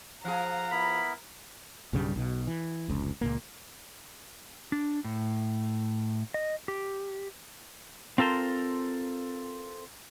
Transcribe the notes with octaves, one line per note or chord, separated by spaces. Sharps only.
F3 G#4 F5 F#5 A#5
B3 E4 A#4 B5
B1 G2 C#3 G3
B1 B2
E3
F1 C#2
C#2 A#2 A#3
D4
A2
D#5
G4
C4 F4 A4 A#4 C5